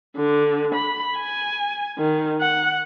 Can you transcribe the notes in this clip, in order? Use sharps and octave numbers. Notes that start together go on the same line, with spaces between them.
D3
B5
G#5
D#3
F#5